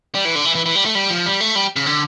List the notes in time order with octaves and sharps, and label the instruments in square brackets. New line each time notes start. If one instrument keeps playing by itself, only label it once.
[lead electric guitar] G3
E3
D3
E3
E3
E3
G3
A3
G3
F3
G3
A3
G3
C#3
D3